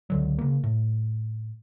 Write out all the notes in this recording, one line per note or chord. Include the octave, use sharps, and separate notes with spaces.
C#2 D3 F#3
C#3 A#3
A2